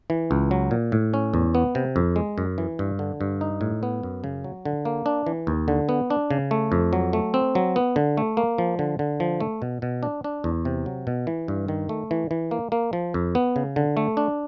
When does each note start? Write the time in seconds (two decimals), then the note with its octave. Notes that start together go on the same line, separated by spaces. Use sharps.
0.10 E3
0.31 C#2
0.51 F#3
0.71 A#2
0.92 A2
1.14 C#4
1.34 E2
1.55 B3
1.75 C3
1.96 F2
2.16 G#3
2.38 F#2
2.58 E3
2.79 G2
2.99 D3
3.21 G2
3.41 D#4
3.61 A2
3.83 B3
4.03 F#2
4.24 C#3
4.44 F#3
4.65 D3
4.85 A#3
5.06 D4
5.26 E3
5.47 D#2
5.68 D3
5.89 B3
6.10 D4
6.31 C#3
6.51 A3
6.72 F2
6.93 F#3
7.13 A3
7.34 C4
7.55 F#3
7.76 B3
7.96 D3
8.17 A3
8.37 A#3
8.58 F3
8.79 D3
8.99 D3
9.20 F3
9.40 A3
9.62 B2
9.82 B2
10.03 D4
10.24 D4
10.44 E2
10.65 C3
10.86 F#3
11.07 B2
11.27 E3
11.48 G2
11.68 D#3
11.89 A3
12.11 E3
12.31 E3
12.51 A#3
12.72 A#3
12.93 F3
13.14 F2
13.35 B3
13.56 C#3
13.76 D3
13.97 A3
14.17 D4